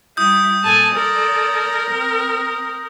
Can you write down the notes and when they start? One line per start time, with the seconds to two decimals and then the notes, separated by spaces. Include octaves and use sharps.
0.17 G3 E4 D#6 G6
0.63 A#2 A4 G#5 A5
0.94 A4 A#4 D5
1.91 C4